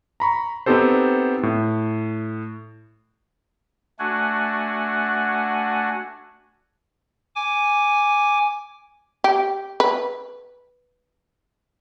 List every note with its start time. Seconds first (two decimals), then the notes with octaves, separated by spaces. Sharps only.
0.20 A#5 B5 C#6
0.66 B3 C4 D#4 G4 A4 C5
1.43 A2
3.99 A3 D4 F#4 F#5 G#5
7.36 G#5 D6
9.24 G4
9.80 B4